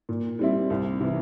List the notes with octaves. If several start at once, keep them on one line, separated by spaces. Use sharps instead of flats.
A#2
G3 C4 E4
C2
C3 E3